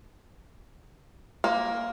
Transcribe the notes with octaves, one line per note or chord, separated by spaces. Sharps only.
A#3